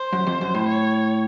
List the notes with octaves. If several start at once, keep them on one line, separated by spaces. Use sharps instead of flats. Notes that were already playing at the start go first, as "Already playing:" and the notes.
Already playing: C5
F#2
F2
F#2
A2
C#5